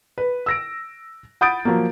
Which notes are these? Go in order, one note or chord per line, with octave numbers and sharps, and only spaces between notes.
B4
E6 A#6 D7
F#5 B5 D#6 G6 A6 D7
F3 F#3 A#3